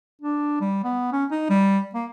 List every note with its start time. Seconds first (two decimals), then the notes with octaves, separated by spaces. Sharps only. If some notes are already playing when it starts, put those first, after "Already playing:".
0.21 D4
0.60 G3
0.84 B3
1.12 C#4
1.31 D#4
1.50 G3
1.94 A#3